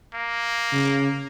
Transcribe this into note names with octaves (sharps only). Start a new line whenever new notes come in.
A#3
C#3